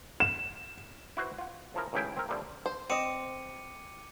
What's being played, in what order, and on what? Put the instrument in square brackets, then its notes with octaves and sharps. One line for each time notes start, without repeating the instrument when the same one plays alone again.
[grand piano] E7
[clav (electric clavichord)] E4 F#4 B4 C5
F4 F#5
C#3 F3 E4 A#4
G#1 C#2 A2 C#3 E4 G5
C4 A#4
D3 F3 G3 A3 A#3
[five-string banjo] C5
[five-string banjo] C4 D#5 [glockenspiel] D6 C#7 D#7